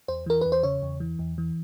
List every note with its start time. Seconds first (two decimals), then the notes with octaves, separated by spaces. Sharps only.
0.08 E2 C5
0.26 E3 A#4
0.41 E2 B4
0.52 C5
0.63 C#3 C#5
0.82 E2
1.00 E3
1.19 E2
1.38 E3